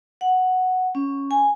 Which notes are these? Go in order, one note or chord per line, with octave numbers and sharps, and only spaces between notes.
F#5
C#4
G#5